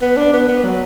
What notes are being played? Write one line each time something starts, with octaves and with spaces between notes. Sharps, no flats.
B3
D4
B3
B3
F#3